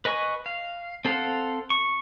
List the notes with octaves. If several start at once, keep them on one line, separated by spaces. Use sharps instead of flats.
B4 D#5 G#5 C#6
F5
C4 A4 C5 F5 F#5
C#6